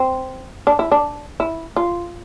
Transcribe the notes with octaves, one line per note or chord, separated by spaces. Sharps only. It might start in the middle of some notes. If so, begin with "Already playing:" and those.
Already playing: C4
D4
E4
D4
E4
F4